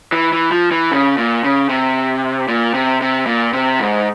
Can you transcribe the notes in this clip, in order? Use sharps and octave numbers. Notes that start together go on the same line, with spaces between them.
E3
E3
F3
E3
C#3
A#2
C#3
C3
A#2
C3
C3
A#2
C3
G#2